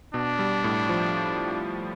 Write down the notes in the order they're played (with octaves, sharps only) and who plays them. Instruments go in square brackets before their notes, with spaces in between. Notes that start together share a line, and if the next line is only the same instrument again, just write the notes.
[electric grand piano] B2 [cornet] D4
[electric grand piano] G3
A2
F3